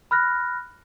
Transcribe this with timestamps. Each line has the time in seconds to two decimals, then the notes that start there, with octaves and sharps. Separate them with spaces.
0.11 B5 F6 F#6 A#6